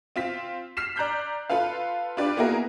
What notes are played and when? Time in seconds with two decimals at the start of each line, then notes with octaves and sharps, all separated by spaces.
0.16 C4 F4 B6
0.77 F6 B6 C7 E7
0.96 D5 A#5 F#6 G6 B6
1.49 F4 A4 B4 F5
2.17 D4 F4 G4 B4 D5
2.37 A#3 B3 E4 F#4 G#4 A#4